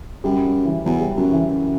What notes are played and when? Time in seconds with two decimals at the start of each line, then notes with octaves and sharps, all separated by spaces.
0.24 F#2 G3
0.44 F#3
0.65 E3
0.85 E2 F#3
1.01 G3
1.17 F#2 F#3
1.32 E3
1.47 F#2